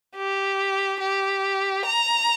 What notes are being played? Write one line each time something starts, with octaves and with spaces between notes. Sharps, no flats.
G4
G4
A#5